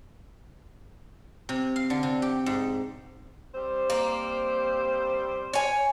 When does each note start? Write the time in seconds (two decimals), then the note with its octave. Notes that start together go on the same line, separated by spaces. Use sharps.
1.49 C3
1.76 F5
1.90 D3
2.03 C3
2.22 G4
2.46 G#2
3.55 G3 C4 C5
3.90 A#3
5.53 C#5 G#5